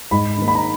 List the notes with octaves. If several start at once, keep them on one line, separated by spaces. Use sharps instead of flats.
G#2 B5
D#3 A#3
B5
A#5